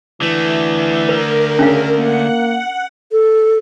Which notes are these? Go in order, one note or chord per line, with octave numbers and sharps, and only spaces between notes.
D3 E3 A3
A#4 B4
C#3 C#4 D4 F5
A#3 F#5
A4